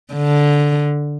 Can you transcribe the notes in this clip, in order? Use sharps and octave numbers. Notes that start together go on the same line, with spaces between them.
D3